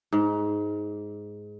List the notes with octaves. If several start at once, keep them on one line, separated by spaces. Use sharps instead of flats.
G#2